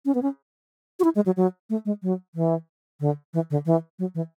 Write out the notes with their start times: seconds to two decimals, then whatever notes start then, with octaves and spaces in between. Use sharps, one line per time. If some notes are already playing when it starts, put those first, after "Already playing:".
0.06 C#4
0.15 B3
0.22 C#4
1.00 F#4
1.04 E4
1.15 G#3
1.26 F#3
1.37 F#3
1.70 A3
1.86 G#3
2.03 F#3
2.35 E3
3.00 D3
3.34 E3
3.50 D3
3.66 E3
3.99 F#3
4.15 E3